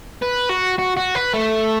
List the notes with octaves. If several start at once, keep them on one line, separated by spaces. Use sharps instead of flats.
B4
F#4
F#4
F#4
B4
A3